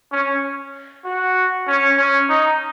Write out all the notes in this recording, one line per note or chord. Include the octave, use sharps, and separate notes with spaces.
C#4
F#4
C#4
C#4
D#4